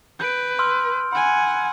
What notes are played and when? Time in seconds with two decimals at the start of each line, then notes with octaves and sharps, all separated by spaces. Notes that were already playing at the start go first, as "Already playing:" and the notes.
0.20 B4 G6 D7
0.59 C6 E6 F6
1.13 F#5 G#5 B5